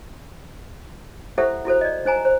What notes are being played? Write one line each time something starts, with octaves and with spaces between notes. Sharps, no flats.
E4 G4 A4 C5 E5 F#5
E4 F#4 A4 C5
D5 D#5
D#4 C5 G#5 A#5
C5